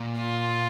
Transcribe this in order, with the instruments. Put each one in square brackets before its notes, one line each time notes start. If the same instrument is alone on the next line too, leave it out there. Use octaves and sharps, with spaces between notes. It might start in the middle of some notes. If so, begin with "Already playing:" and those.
Already playing: [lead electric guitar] A#2
[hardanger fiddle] F4